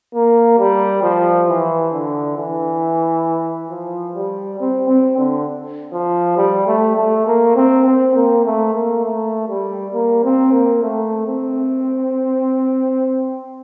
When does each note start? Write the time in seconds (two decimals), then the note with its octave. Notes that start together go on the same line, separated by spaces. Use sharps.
0.15 A#3
0.59 G3
1.03 F3
1.48 E3
1.93 D3
2.37 E3
3.70 F3
4.15 G3
4.60 C4
4.88 C4
5.18 D3
5.93 F3
6.37 G3
6.67 A3
6.96 A3
7.27 A#3
7.56 C4
7.85 C4
8.15 A#3
8.45 A3
8.74 A#3
9.05 A3
9.49 G3
9.94 A#3
10.24 C4
10.52 A#3
10.83 A3
11.27 C4